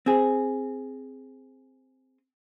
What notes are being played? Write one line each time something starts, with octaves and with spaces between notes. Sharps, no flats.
C4 G#4